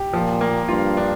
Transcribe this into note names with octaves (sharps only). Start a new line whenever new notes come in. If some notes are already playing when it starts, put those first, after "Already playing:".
Already playing: G4
A#2 F3
A#3
G2 F4
D4